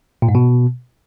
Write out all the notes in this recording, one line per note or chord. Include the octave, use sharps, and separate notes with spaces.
A#2
G#2
B2